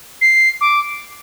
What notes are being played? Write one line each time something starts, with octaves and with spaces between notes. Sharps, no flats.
C7
D6